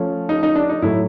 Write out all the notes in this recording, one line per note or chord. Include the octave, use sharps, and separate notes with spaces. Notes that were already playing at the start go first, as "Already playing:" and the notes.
Already playing: F3 A3 C#4
D#4
D#4
D4
D#4
A2 F#3 A3 E4